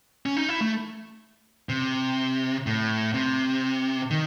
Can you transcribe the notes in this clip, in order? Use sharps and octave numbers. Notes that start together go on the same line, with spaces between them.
C#4
D#4
E4
A3
C3
A2
C3
D#3